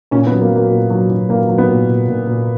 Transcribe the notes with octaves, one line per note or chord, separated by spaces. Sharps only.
A#2 C#4
B3
F#3
A#3
F#3
A#3
A#2
F#3
F#3
A#2 A#3
F#3
B3
A#2
A#2
A#2
A#2